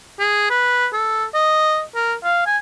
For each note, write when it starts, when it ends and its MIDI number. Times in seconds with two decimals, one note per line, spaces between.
0.19 0.45 68
0.50 0.87 71
0.93 1.25 69
1.34 1.81 75
1.95 2.14 70
2.24 2.46 77
2.46 2.58 80